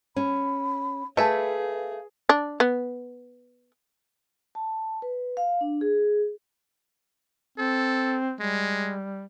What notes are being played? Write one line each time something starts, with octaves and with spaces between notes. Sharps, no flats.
C#4 B5
A3 G#4 B4 E5 F5 G#5
D4
B3
A5
B4
F5
D4
G#4
C4 A4
G3 G#3